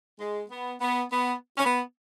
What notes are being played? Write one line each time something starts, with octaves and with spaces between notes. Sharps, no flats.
G#3
B3
B3
B3
C#4
B3